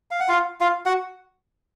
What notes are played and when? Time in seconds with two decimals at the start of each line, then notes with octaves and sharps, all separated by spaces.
0.11 F5
0.20 F#5
0.28 F4 F5
0.61 F4 F5
0.86 F#4 F#5